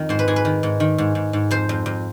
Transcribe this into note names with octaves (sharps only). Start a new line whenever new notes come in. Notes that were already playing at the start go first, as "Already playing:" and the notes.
Already playing: F2 D#3
G#2 C5
B4
G#2 G#4
B4
D#3
G#2
D#3
G#2
G#2
G#2
F2 C5
F2
F2